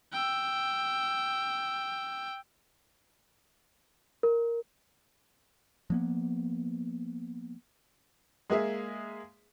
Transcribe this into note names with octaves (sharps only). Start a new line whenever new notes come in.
G5 E6
A#4
F3 A#3 B3
G#3 A#3 G#4 E5